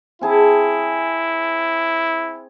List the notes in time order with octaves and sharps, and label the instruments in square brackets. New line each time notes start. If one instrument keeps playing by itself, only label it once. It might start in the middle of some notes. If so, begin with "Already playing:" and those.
[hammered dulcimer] C4 G#4 A5 [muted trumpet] E4